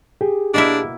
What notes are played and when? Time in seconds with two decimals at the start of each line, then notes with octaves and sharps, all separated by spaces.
0.21 G4 G#4
0.54 B2 A#3 D4 E4